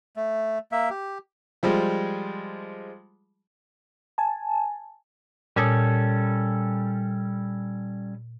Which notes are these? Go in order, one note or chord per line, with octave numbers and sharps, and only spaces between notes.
A3
A#3 E5
G4
F3 G3 G#3
G#5 A5
A#2 G3 C#4 A4 D#6